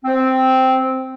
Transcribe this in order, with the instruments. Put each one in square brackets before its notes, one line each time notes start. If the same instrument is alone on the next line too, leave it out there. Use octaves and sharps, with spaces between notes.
[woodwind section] C4